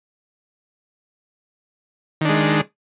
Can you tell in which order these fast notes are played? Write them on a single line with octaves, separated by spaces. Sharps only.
D#3 D4 G#3